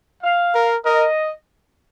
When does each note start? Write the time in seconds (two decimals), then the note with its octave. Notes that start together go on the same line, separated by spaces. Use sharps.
0.23 F5
0.55 A#4
0.85 A#4 D#5